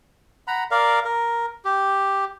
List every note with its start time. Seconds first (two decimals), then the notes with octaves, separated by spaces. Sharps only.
0.47 F#5 A#5 B5
0.71 A#4 D5 F5
1.05 A#4
1.65 G4